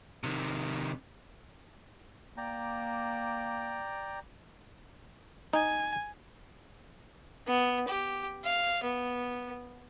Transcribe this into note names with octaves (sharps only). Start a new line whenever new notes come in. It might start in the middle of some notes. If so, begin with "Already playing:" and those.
C3 D#3
A#3 D5 G5 A#5
D#4 G#5
B3
G4
F5
B3